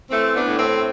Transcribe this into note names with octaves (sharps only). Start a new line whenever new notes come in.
E3 A3 C4
B3 D4
A2
A3 C4